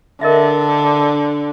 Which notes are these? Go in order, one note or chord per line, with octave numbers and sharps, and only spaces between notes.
D3 A#4 D#5 E5